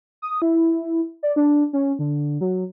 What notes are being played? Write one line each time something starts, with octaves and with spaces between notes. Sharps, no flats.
D#6
E4
D5
D4
C#4
D3
F#3